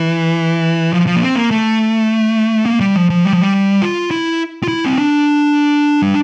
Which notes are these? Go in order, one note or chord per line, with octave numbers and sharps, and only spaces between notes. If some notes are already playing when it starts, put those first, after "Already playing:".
Already playing: E3
F3
F3
A#3
C4
A#3
A3
A#3
G3
F3
F3
G3
F3
G3
F4
E4
F4
E4
C4
D4
G3